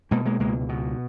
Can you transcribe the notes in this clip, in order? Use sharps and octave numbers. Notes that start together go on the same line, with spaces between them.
B2 G#3 A#3
G#3 A#3
C#2 G#3 A#3
B2